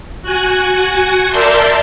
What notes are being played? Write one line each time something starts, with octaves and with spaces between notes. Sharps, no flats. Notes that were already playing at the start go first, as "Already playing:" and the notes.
F#4 F#5 G#5
A#4 D5 E5 A5 C6 G6